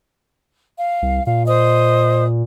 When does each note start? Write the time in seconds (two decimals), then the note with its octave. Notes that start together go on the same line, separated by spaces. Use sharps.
0.78 F5
1.02 C2
1.27 A#2 F5
1.46 C5 D#5 D#6